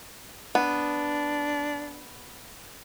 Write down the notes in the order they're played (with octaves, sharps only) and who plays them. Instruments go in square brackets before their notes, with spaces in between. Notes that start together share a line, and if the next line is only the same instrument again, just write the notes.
[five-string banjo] B3 [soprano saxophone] D4